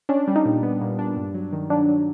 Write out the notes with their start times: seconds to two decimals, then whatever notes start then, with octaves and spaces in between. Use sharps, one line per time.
0.09 C#4 D4
0.27 G3
0.36 D#4
0.45 A#2
0.63 B3
0.81 A#2
0.99 D4
1.16 G2
1.35 F#3
1.52 D#3
1.70 F#3 D4
1.89 F#3